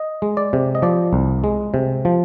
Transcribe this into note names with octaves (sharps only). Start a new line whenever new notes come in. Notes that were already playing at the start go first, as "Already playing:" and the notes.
Already playing: D#5
G#3
D5
C3
D#5
F3 D5
C2
G#3
C3
F3